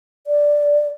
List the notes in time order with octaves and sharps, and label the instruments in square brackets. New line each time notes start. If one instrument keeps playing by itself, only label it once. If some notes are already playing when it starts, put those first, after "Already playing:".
[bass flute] D5